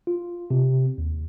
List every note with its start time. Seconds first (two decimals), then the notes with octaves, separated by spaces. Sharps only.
0.07 F4
0.51 C3
0.98 D#2